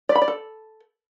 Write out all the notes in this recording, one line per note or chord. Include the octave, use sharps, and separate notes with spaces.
D5
B5
D5
A4